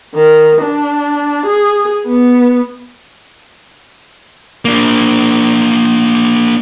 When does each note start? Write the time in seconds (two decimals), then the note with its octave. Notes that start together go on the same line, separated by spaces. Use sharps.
0.15 D#3
0.62 D4
1.46 G#4
2.07 B3
4.65 A#3 D4